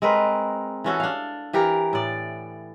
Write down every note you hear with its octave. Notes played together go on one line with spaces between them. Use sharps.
G#3 C4 A#4 B4
E3 C#4 F#4 A4
D4 F5
E3 G4 A#4
A2 D5